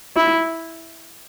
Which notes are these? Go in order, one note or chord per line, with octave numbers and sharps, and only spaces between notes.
E4